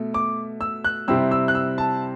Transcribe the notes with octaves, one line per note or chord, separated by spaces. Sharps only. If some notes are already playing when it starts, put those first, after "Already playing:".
Already playing: B2 A3
D6
E6
F#6
C3 G3 C4 E4 E6
E6
F#6
E6
A5